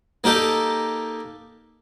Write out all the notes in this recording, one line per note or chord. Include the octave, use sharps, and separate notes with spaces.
A#3 D#4 G4 A4